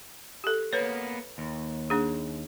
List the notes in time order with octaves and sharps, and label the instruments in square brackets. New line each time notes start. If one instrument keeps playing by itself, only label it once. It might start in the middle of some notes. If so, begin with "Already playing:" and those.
[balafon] G4 A4
[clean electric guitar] A#3 B3 [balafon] B4 C#5
[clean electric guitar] D#2
[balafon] A#3 D4 G#4